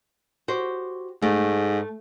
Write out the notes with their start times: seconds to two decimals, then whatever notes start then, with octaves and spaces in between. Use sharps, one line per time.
0.48 F#4 G4 C5
1.22 G#2 A3